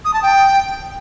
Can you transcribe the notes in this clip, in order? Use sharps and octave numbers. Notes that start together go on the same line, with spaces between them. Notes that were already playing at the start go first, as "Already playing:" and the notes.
D#6
A5
G5